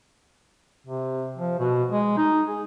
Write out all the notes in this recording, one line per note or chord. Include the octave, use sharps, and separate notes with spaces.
C3
F3
B2
G#3
D#4
G#4